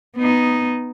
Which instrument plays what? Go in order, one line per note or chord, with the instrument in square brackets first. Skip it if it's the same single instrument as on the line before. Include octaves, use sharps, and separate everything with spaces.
[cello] B3 D#4